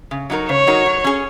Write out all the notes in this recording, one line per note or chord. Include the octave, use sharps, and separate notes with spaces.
C#3
F#3 D#4 F#4 A#4
C#3 C#5
F#3 D#4 F#4 A#4
F#3
C#4 G#4